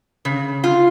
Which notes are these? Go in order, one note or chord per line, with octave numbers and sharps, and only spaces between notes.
C#3
F4